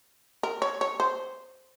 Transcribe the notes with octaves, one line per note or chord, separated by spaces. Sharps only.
A#4
C#5
C#5
C5